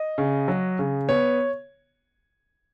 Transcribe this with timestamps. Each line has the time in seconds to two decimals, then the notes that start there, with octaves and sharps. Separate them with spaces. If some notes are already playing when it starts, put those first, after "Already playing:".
Already playing: D#5
0.18 C#3
0.48 F#3
0.79 C#3
1.09 B3 C#5